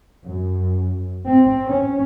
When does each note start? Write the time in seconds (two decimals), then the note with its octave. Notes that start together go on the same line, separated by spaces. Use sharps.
0.24 F#2
1.27 C4
1.66 C#4